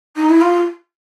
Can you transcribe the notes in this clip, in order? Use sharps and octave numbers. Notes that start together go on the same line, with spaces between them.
D#4
E4
F4